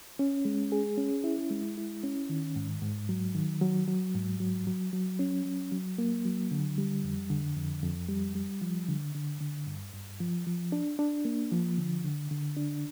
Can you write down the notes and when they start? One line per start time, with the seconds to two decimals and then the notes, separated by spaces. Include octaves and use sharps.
0.19 C#4
0.45 G#3
0.72 G#4
0.97 C#4
1.24 E4
1.50 G#3
1.78 E4
2.03 C#4
2.29 D#3
2.56 G#2
2.82 G#2
3.09 F#3
3.35 D#3
3.61 F#3
3.88 F#3
4.15 G#2
4.40 F#3
4.67 F#3
4.93 F#3
5.19 C#4
5.45 F#3
5.72 F#3
5.98 A#3
6.25 F#3
6.51 D3
6.78 G3
7.04 F2
7.30 D3
7.57 F2
7.83 F2
8.09 G3
8.35 G3
8.62 F3
8.88 D3
9.15 D3
9.41 D3
9.67 G2
9.93 G2
10.20 F3
10.47 F3
10.72 D4
10.99 D4
11.25 A#3
11.51 F3
11.78 D3
12.05 D3
12.31 D3
12.57 D4